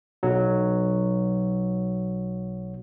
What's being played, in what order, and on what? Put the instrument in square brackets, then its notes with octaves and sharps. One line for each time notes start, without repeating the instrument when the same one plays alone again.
[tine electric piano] B1 F#3